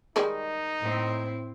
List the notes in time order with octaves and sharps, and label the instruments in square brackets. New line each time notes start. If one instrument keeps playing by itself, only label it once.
[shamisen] D#3 G3 G#3 [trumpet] D#4
[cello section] A2 C4 E4